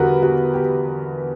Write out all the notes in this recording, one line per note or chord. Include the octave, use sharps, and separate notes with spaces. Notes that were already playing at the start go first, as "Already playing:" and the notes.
Already playing: E2 D3 G3 F#4 A#4 B4
F#4
G4